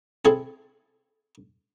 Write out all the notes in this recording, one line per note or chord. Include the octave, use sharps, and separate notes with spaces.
C4 E4 G#4 A4